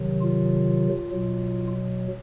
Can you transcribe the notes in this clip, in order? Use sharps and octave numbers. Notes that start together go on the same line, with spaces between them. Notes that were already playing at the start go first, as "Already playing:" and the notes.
Already playing: C3 D#3 F#3
F4
B2 F#3